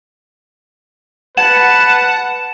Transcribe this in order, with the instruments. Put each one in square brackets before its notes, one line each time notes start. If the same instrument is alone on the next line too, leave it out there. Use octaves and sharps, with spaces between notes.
[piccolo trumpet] B4 [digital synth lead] F#5 [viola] A5 [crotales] E7